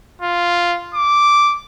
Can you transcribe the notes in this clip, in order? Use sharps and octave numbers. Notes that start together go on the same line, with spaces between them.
F4
D6